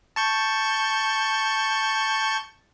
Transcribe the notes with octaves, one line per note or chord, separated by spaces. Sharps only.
A5 C#6 G6